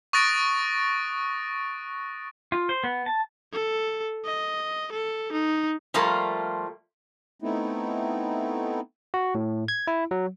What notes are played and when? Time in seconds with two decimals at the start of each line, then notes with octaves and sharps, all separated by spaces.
0.13 C#6 D#6 F#6 A6 A#6 D7
2.52 F4
2.69 C5
2.84 B3
3.06 A5
3.53 A4
4.25 D#5
4.92 A4
5.32 D#4
5.94 F3 G3 A3 A#3 F4
7.42 A3 B3 C4 D#4 E4
9.14 F#4
9.35 A2
9.68 G#6
9.87 E4
10.11 F#3